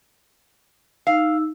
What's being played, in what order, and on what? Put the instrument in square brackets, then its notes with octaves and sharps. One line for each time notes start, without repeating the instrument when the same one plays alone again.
[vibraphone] D#4 E6 [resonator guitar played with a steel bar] F5